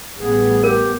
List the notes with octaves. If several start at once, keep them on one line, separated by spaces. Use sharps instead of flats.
A1 G3 B3 G#4
G4 A#4